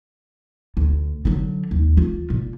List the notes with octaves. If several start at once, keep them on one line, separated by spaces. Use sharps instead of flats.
D2
D3 F#3
D#2
E3 F4
A#2